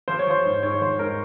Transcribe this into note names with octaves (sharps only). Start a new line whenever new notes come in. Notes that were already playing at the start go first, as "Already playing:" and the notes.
F3 C5
C#5
F3 C5
G#2
G#2 C#5
F3 C5
G#2 A#4